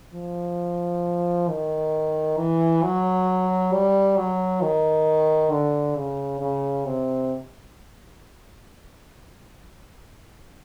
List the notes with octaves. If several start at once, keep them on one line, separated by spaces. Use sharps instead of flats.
F3
D#3
E3
F#3
G3
F#3
D#3
D3
C#3
C#3
C3